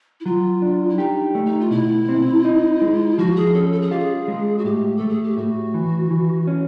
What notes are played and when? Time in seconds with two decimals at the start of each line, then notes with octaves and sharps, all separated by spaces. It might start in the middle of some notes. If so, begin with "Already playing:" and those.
0.20 E4
0.25 F#3 F4
0.62 D4
0.90 E4
0.98 D#4 G4
1.35 A3
1.46 D#4
1.60 F4
1.71 B2 E4
2.09 C4
2.44 D#4
2.81 G#3
3.18 F3 F#4
3.36 G#4
3.54 C#4 A4
3.72 A4
3.82 G#4
3.91 F4 G4
3.99 G#4
4.28 G#3
4.58 F#4
4.64 A2 G4
4.97 A3 A4
5.09 G#4
5.23 G4
5.37 A2 F#4
5.74 E3
6.10 E3
6.47 C#4